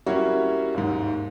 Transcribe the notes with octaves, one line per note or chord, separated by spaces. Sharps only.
G3 A#3 C#4 E4 F#4 C#5
D#2 G#2